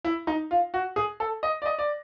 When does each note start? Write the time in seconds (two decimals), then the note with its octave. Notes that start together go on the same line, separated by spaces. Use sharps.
0.05 E4
0.27 D#4
0.51 F4
0.74 F#4
0.96 G#4
1.20 A4
1.43 D#5
1.62 D5
1.66 D#5
1.79 D5